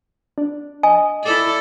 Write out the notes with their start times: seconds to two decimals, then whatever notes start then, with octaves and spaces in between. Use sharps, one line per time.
0.38 D4
0.83 D#5 G#5
1.23 E4 A4 D5